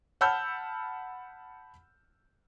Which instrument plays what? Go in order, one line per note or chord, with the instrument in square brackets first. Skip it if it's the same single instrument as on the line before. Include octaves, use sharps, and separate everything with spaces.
[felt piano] F#5 A5 B5 E6 F6 G6